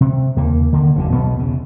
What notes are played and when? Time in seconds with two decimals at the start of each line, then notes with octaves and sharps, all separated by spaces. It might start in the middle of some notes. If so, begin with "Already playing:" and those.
0.01 C3
0.36 D#2 C#3 A#3
0.73 D3 D#3 A#3
0.95 F#1 D#2 D3
1.10 E1 B1 B2 B3
1.35 E2 C#3